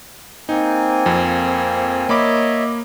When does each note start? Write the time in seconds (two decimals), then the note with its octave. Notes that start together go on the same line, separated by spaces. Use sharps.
0.49 A#3 C4 D#4 G#5
1.06 F2
2.09 A#3 C#5 D#5 E5 B5 D6